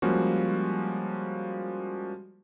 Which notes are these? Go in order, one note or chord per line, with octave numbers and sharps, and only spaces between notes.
F3 G3 G#3 A#3 C#4 F#4